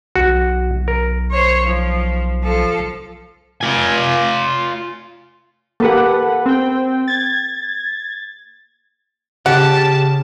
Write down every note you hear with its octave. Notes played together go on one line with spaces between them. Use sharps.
B1 F#4
A#4
C5 C#5
F3
F3 A4
F4 G#5
A#3 G4 A4 B4 F#5
C4 G5
G#6 A6
C#3 G4 F#5 A5